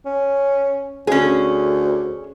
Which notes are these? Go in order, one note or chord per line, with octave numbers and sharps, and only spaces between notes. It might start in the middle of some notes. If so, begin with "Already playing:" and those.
C#4
D2 C#4 G#4